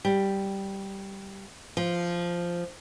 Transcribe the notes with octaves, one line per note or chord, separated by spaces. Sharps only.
G3
F3